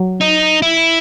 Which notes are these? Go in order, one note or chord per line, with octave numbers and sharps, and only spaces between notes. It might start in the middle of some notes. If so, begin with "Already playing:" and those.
Already playing: F#3
D#4
E4